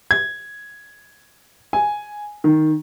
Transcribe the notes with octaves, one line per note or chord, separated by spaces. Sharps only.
G#6
G#5
D#3